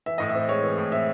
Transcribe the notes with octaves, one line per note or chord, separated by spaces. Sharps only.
E3 E5
A2 D#5
E5
C4
G#3 C#5
E3
A2
C4 E5